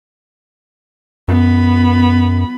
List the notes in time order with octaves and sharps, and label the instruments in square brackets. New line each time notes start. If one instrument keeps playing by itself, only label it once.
[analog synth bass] F#2 [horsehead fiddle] B3 B5